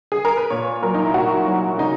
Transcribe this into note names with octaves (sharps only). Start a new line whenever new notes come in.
G#4
A#4
B4
A#2 C#5
F#3 A#4
D#4
E4
A#2 F#4
F#3
C#3 D#4